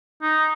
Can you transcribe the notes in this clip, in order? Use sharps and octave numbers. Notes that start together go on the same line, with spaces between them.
D#4